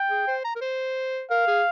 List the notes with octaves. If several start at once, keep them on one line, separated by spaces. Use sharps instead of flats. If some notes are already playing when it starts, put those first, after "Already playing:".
Already playing: G5
G#4
C5
A#5
A#4
C5
A#4 F5
G#4